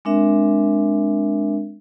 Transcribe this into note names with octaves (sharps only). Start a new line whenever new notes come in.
G#3 C4 D4 A#4 E5